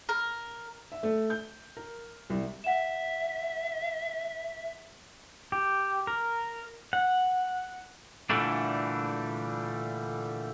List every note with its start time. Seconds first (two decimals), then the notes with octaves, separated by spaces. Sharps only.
0.09 A#4
0.92 E5
1.03 A3
1.30 G6
1.77 A#4
2.30 C2
2.64 E5 F#5 E7
5.52 G4
6.07 A#4
6.93 F#5
8.30 A#2 D3 E3 G3 A3 D4